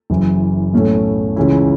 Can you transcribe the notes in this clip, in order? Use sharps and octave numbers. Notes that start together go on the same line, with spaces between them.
F#1 F#2 E3
B1 A2 A3 C#4 E4
C#2 C#3 E3 C#4 E4